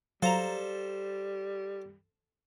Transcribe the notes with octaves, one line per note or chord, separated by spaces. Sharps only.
F#3 G3 A4 C5 F5 A5 A#5